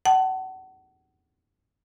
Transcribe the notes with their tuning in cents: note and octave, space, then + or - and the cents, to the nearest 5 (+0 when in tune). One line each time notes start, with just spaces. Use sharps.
F#5 +30 A5 +0